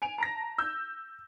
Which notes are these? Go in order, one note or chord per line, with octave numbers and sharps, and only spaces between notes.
G#5 D7 F7
A5 A#5 A#6
E6 G6